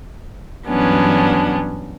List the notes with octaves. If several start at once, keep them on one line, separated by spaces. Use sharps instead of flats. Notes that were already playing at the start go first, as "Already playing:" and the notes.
G2 E3 F#3 B3 C#4 D4